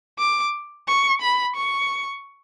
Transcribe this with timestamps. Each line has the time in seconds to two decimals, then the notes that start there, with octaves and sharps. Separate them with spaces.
0.19 D6
0.88 C#6
1.22 B5
1.56 C#6